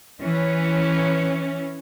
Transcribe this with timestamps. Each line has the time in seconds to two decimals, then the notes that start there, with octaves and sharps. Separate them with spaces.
0.20 E3 C#4